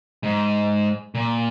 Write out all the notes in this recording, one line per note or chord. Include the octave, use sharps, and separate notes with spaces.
G#2
A#2